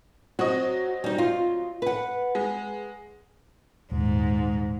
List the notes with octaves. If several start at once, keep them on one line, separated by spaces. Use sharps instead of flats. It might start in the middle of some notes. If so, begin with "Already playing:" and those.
F#3 C4 F#4 D#5
G3 D#4
F4
B4 F#5
G#3
D#1 G#2